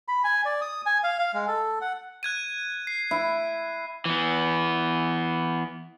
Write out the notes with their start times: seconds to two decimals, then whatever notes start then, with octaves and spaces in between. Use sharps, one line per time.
0.08 B5
0.24 G#5
0.45 D5
0.61 D#6
0.86 G#5
1.03 F5
1.19 F5
1.34 G#3
1.48 A4
1.81 F#5
2.23 F#6 G#6 D#7
2.87 C7
3.11 E4
4.05 E3 B3